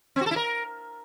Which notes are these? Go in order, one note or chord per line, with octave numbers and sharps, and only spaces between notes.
C4
F#4
A4
E4
A#4